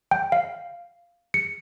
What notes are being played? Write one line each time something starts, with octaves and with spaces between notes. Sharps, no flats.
G5
F5
C#7